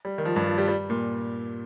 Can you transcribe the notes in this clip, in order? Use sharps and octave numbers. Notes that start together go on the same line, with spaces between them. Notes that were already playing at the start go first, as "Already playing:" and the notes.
G3
D#3
F3
G2
F3
G3
G3
A#2